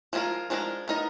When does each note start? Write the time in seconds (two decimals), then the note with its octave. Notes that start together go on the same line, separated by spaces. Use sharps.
0.13 F3 G#3 D4 F4 A#4
0.50 F3 G#3 D4 F4 A#4
0.88 B3 D#4 A#4 D#5